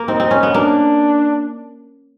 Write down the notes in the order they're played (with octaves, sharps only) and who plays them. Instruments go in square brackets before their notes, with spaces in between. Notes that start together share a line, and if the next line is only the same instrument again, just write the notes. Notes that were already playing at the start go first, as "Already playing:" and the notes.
Already playing: [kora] A#3
[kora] C4 [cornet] D#4
[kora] C4
C#4
B3
[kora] A#3 [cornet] D4